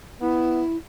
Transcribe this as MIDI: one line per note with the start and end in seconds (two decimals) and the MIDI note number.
0.21 0.64 59
0.21 0.77 64